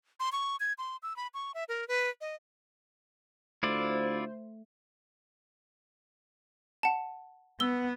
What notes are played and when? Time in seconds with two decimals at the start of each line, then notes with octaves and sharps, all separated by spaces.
0.20 C6
0.32 C#6
0.60 G#6
0.78 C6
1.03 E6
1.16 B5
1.34 C#6
1.54 E5
1.69 A#4
1.88 B4
2.21 D#5
3.63 D2 A3 E4 F4 C5 D5
6.83 F#5 A5
7.60 B3 E6 G7